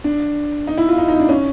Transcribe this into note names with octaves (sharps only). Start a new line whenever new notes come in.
D4
D#4
E4
F4
D#4
D#4
D4
C#4